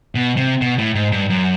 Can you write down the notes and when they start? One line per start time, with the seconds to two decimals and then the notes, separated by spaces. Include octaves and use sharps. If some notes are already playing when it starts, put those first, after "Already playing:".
0.15 B2
0.37 C3
0.62 B2
0.78 A2
0.95 G#2
1.13 G2
1.30 F#2